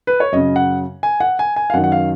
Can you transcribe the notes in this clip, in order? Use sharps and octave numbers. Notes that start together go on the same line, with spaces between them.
B4
C#5
F#2 C#3 D#5
F#5
G#5
F#5
G#5
G#5
F5
F#2 D#3 F#5
F#5
F5